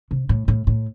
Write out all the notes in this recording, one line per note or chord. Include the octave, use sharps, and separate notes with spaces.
C3
A2
A2
A2